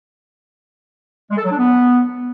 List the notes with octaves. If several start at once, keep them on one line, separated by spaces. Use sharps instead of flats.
G#3
A4
F#3
D4
B3